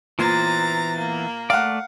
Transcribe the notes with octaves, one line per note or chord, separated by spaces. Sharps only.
A#2 E3 B3 C5 A#5 A6
A#3
A3 D5 F5 F#5